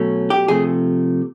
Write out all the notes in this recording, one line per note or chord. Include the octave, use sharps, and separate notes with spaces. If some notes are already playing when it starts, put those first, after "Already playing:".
Already playing: B2 F#3 A3 C#4
G4
C3 F3 A3 G#4